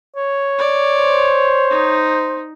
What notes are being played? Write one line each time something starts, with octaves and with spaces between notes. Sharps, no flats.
C#5
D5
C5
D#4